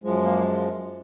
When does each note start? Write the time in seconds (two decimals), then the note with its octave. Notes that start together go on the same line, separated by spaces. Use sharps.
0.04 F#2 F3 G#3
0.24 A#3